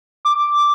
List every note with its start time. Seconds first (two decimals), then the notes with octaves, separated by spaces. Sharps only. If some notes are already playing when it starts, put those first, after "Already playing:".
0.25 D6